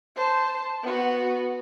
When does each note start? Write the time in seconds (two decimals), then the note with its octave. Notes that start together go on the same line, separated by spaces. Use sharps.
0.16 C5 A5
0.83 B3 F#4